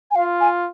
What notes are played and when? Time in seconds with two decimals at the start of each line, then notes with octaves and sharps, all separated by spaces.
0.11 G#5
0.15 F4 F5
0.41 G#5